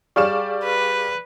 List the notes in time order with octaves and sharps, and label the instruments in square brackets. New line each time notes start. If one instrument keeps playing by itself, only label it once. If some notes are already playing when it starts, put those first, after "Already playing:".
[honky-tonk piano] G3 D5 E7 [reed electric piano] G#4 F5 C#6
[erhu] B4